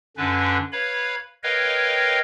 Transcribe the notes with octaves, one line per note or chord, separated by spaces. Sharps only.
F#2 D3 C#4 D4 B4
B4 C#5 F5 B5
A#4 B4 C#5 D#5 F5 G5